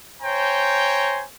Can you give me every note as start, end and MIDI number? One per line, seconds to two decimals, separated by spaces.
0.22 1.23 72
0.22 1.23 73
0.22 1.23 79
0.22 1.23 80
0.22 1.23 82